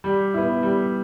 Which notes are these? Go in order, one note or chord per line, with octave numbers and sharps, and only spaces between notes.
G3
B3 E4
G3